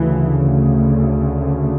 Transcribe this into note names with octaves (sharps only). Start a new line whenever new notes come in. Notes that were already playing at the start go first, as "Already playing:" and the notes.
Already playing: D2 C#3 E3